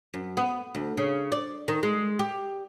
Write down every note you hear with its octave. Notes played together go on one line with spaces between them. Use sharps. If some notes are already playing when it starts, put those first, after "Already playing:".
F#2
B3
D2
C#3
D5
D#3
G#3
G4